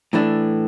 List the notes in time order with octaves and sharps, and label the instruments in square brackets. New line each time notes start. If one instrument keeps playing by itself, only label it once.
[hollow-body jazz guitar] A2 E3 A3 D4